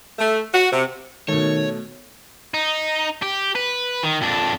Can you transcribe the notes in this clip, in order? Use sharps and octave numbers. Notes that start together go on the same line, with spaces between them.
A3
F#4
C3
B2 D#3 A3 C#5
D#4
G4
B4
D#3
F2 D4